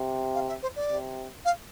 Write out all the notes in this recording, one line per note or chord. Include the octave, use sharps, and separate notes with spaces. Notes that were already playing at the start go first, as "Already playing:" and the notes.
Already playing: C3
F5
E5
C5
D5
C3
F5